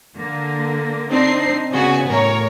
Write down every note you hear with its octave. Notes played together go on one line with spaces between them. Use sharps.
D3 A#3
C4 D4 D#4 C7
C#3 B3 F#4 G#5
A2 A#4 C#5